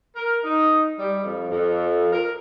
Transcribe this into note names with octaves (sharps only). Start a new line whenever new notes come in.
A#4
D#4
G3
F2
F2
A#4